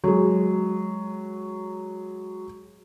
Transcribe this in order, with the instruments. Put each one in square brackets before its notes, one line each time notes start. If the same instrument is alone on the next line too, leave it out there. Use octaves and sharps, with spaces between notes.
[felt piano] F#3 G#3